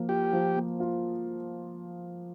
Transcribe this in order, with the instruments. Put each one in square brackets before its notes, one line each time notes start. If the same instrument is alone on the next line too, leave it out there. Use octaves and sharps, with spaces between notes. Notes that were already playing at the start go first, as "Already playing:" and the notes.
Already playing: [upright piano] F3 A#3
[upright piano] F4 [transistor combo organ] G4
[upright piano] F3
A#3
F4